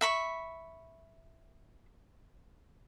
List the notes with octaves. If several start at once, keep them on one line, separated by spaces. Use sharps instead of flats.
E5 B5 C#6